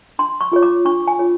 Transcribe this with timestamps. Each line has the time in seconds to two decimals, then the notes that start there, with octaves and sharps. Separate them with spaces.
0.19 D4 C6
0.41 C#6
0.52 F4 G#4 C#5
0.63 D6
0.85 D4 C#6
1.08 G#5
1.19 F4 G#4 C#5